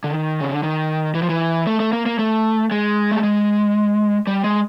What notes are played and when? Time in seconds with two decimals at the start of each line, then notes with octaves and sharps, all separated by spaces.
0.04 D3
0.10 D#3
0.40 C#3
0.51 D3
0.63 D#3
1.14 E3
1.22 F3
1.29 E3
1.67 A3
1.80 A3
1.93 A#3
2.06 A#3
2.19 A3
2.71 G#3
3.11 A3
3.23 G#3
4.27 G3
4.44 G#3